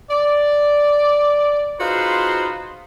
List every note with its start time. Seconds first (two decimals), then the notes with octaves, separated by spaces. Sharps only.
0.11 D5
1.80 D#4 F4 F#4 G#4 B4 C5